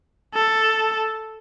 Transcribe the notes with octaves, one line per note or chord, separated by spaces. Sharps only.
A4